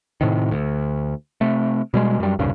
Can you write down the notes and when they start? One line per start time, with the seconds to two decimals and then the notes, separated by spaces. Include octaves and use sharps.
0.21 A2 C3 D#3
0.51 D2
1.41 C3 A3
1.94 B2 G3 G#3
2.20 F#2 G3
2.39 D#1 C2 G2 C#3